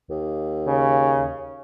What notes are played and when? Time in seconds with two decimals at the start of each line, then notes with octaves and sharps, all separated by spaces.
0.10 D#2
0.67 C#3